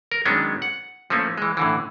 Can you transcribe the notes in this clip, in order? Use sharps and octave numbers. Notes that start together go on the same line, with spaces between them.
A#4
D#3 F#3 G#3 B3 C#4 D4
F#5
F3 A3 A#3 C#4
E3 G#3
A2 D3 E3